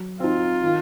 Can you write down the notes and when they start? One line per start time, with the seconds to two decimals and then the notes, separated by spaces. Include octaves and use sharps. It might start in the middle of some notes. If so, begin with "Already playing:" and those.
Already playing: F#3
0.20 C4 D#4 F4
0.62 D#3